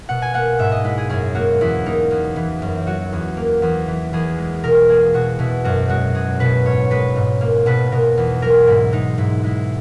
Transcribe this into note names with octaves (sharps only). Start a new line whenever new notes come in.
B2 F#5
G#5
A#3 F#5
G#2 E5
D#5
G#3 E4
G#4
F#2 G#4
A#3 F#4
E2 E4
A#3 D#4
E2
E3
F#2
F#3 F#4
E2
A#3
E2
E3
E2 G#4
G#3
B2 A#4
A#3 G#4
B2 F#4
B2 E4
F#2 F#4
G#3 F#4
B2 G#4
B2 B4
G#2 C#5
G#3 B4
G#2
A#3
B2 B4
B2 A#4
E2
F#3 A#4
G#2 E4
G#3 D#4
G#2 E4
G#3 E4